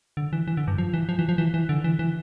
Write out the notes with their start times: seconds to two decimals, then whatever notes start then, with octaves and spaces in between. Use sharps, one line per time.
0.17 D3
0.33 E3
0.48 E3
0.57 D3
0.68 G2
0.78 F3
0.94 E3
1.09 F3
1.19 E3
1.29 F3
1.38 E3
1.54 E3
1.69 D3
1.84 E3
1.99 E3